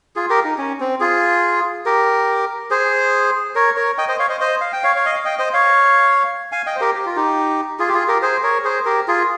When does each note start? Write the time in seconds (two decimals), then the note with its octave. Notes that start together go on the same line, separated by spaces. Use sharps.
0.16 F4 G#4
0.30 G4 A#4
0.44 D#4
0.58 C#4
0.80 C4
1.00 F4 G#4
1.86 G4 A#4
2.70 G#4 C5
3.55 A#4 C#5
3.76 A#4 C#5
3.98 D#5 G5
4.08 C5 D#5
4.19 C#5 F5
4.29 C5 D#5
4.40 C5 D#5
4.61 F5
4.73 G5
4.84 C#5 F5
4.96 C#5
5.05 D#5
5.15 F5
5.25 D#5 G5
5.39 C5 D#5
5.53 C#5 F5
6.52 F5 G#5
6.66 D#5 G5
6.76 C5
6.81 G4 A#4
6.95 G4
7.06 F4
7.16 D#4 G4
7.79 F4 G#4
7.88 G4
7.93 F4 G#4
8.08 G4 A#4
8.22 G#4 C5
8.43 A#4 C#5
8.64 G#4 C5
8.85 G4 A#4
9.08 F4 G#4